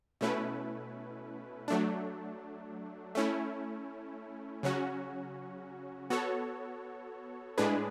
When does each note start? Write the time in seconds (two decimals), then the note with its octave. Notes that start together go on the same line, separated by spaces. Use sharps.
0.21 B2 A3 C#4 E4 B4
1.68 F#3 A3 D4
3.15 A3 C#4 E4
4.63 C#3 F#3 C#4 F#4
6.10 B3 F#4 A4 C#5
7.58 A2 G#3 D4 G#4 B4